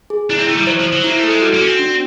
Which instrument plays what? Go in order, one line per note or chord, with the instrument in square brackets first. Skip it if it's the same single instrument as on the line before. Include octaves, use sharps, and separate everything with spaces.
[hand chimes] G#4
[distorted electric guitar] D4 [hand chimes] E4
[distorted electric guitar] C4
[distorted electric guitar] A3 [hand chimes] E4
[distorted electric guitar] G3
[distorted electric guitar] F#3 [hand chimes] C5
[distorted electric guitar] F3
[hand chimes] C5
[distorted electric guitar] F#3
[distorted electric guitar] A#3 [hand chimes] E4
[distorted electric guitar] A3 [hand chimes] A4
[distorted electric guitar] G#3
[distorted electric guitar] G3 [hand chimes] F#4
[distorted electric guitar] A#3
[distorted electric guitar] C#4 [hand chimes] F#4
[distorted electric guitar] C4
[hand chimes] D4